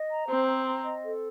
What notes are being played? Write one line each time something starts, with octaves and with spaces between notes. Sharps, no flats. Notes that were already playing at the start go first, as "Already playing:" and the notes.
Already playing: D#5
A#5
C4 C5
A#5
A#5
D#5
A4